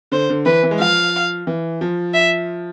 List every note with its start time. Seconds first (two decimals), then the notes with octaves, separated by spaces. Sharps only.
0.12 D3 C5
0.30 D3
0.46 E3 B4
0.63 E3
0.71 G#3
0.79 F3 F5
1.47 E3
1.81 F3
2.14 E5